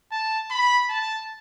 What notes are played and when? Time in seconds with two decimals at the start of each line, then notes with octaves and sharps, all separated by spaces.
0.12 A5
0.51 B5
0.89 A5